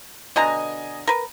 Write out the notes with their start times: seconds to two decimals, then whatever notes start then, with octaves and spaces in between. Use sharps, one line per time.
0.36 B2 D3 D#5 G#5 A#5
1.07 A#4 B4